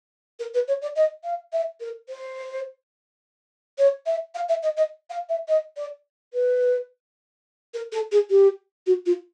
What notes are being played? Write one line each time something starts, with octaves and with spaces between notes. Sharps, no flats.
A#4
B4
C#5
D5
D#5
F5
E5
A#4
C5
C#5
E5
F5
E5
D#5
D#5
F5
E5
D#5
D5
B4
A#4
A4
G#4
G4
F#4
F4